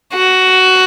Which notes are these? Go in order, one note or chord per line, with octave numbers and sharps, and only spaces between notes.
F#4